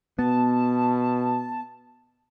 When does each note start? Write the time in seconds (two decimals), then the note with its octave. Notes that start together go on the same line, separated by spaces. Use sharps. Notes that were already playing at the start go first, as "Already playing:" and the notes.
0.19 B2 B3 A5